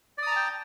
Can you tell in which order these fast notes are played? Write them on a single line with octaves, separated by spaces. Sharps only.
D5 D#6 A#5 A5 G5